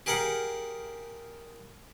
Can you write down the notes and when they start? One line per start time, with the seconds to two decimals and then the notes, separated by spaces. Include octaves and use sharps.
0.06 G4 G#4 A#4 F5 F#5